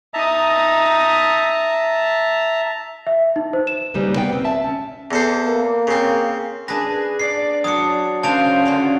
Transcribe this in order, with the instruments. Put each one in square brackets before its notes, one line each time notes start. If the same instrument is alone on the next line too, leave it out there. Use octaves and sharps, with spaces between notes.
[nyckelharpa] D#4 D#6 [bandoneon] E5 A5 A#5
[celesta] E5
D#4
C5
E7
[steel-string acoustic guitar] C#3 G3 A#3 D#4 B4
B3 B4 F5 G5
C4
E5 A5
C#4
[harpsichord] E2 A4 C5
[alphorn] A#3
[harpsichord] C#3 C4
[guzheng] D4 B4 [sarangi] G#4 [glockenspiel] A#6
[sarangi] D5 [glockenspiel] C7
[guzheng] F#3 F#4 [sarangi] D4 [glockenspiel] D#6 C#7
[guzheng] C#3 F#3 D4 [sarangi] C5 [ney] F5 [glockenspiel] A5 D7 F7
[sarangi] D3 [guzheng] C#4 F4 F#4